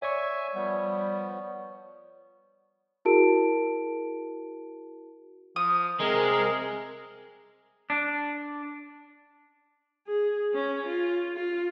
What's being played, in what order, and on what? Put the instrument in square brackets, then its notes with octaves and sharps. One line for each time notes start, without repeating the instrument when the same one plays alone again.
[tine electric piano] C#5 D5 C#6 [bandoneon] E5 G#5
[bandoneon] F3 B3 [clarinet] G3
[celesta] E4 F#4 G#4 A#4 A5 D7
[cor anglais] F3 [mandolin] D#6
[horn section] C3 A#4 [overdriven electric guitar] G#3 [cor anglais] G#4
[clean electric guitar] D4
[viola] G#4
C#4
F4
F4